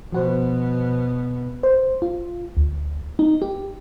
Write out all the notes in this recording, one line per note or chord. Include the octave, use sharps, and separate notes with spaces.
B2 F3 B3 F#4 C5
C5
F4
D2
D#4
G4